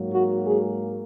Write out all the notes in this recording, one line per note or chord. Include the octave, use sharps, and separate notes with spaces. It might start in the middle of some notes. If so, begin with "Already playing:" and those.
Already playing: G#2 F#3 A#3
F#4
G#4